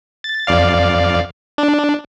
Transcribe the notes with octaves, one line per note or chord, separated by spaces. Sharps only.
A6
F2 D5 F5
D4